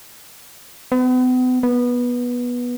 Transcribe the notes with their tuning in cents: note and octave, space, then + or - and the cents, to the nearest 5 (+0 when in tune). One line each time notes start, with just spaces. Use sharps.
B3 +40
B3 -15